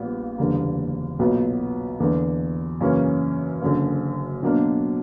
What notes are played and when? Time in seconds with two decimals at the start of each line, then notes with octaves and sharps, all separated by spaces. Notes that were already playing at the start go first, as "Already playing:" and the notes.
Already playing: A#1 A#2 G3 B3
0.38 F#1 E2 D3 G3 A#3
1.19 B1 A#2 F#3 B3
2.00 E2 D3 A#3
2.81 F#2 C#3 E3 A#3 C#4
3.62 F#1 F#2 D3
4.43 B2 F#3 A#3 D4